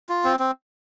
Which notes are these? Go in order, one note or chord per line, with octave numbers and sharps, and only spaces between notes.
F4
C4
C4